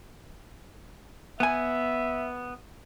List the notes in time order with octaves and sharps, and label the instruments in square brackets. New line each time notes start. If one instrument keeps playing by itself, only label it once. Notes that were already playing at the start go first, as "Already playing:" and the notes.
[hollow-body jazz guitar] B3 G#5 [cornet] E5